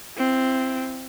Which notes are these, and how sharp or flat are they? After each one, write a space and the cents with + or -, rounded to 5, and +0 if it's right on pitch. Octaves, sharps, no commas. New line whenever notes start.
C4 +0 E4 +40